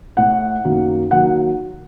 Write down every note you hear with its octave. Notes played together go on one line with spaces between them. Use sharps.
A2 A3 F#5
F#2 D#3 F#3 A#3
D#3 F#3 A#3 F#5